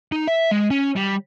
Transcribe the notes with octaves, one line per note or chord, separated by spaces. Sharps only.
D#4
E5
G#3
C#4
G3